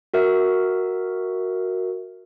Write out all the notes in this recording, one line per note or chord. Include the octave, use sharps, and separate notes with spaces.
F#4 A#4 E5